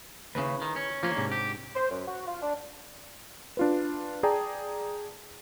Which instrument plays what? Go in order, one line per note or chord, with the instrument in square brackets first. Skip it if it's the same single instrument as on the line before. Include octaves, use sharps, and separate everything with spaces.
[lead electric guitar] D#2 C#3 [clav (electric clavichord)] E4 G#4 B4
[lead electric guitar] D#3
C#4
[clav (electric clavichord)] F3 F4 [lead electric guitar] A#3 C#4
[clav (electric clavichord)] G#2 C3 D4
[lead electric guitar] G4
[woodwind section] C5
F#2
F#4
F4
D4
[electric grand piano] D4 F4 B4
G#4 D5 G5 A5 A#5